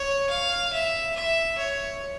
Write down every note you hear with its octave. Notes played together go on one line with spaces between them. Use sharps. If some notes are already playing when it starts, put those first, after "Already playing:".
Already playing: C#5
F5
E5
E5
C#5